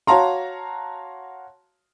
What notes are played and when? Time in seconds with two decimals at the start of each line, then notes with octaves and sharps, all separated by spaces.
0.07 F#4 C#5 F5 A5 A#5 C6